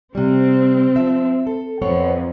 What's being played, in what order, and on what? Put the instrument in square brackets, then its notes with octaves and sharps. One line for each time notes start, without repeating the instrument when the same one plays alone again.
[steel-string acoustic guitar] C3 G3 [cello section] C4
[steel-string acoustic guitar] F3 E5
A4
[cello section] F2 [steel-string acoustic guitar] B3 C4 C#5